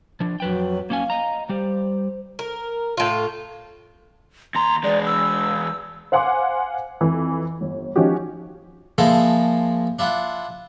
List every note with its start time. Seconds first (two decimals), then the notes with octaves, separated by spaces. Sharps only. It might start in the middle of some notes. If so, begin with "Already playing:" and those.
0.20 F3 D4
0.40 F2 F#3 B4 G5
0.90 A#3 C#4 F5 G#5
1.10 D#5 A#5
1.49 G3 G4 C5
2.39 A#4
2.97 A2 F4
4.55 D#2 A#5 C6
4.84 E2 G#3 D5
5.05 E6
6.12 C5 F5 F#5 G#5 C6 D6
7.01 F2 E3
7.61 G1
7.96 F3 C#4 D#4 F#4 G4
8.98 F3 G#3 A#3 E4 G#4 A4
9.99 D4 E4 F4 F#5